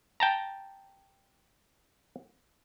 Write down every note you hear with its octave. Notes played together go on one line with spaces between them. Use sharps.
G5 A5 A#5